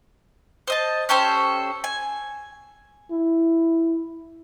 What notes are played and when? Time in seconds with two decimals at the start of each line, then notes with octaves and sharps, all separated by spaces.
0.67 C5 D#5 A5
1.09 C#4 G4 A4 C5
1.84 G#5
3.11 E4